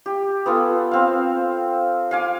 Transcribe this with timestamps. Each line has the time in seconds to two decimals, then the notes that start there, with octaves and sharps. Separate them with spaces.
0.06 G4
0.46 B3 F4 A4 G#5
0.91 C4 F5
2.11 F5 G#5 D6